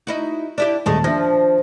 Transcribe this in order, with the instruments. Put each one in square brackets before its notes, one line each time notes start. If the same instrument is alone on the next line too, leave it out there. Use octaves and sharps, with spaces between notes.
[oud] D#4 E4 F#4
D4 E4 G4
[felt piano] D#1 A5 [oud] F#2 G#3 A3
[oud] F3 [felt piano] D4 E5 A#6